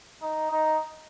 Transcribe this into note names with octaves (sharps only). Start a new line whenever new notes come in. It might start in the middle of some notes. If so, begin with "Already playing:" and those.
D#4
D#4